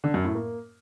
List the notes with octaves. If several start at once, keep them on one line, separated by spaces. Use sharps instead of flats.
D3
F#2
A2
A#3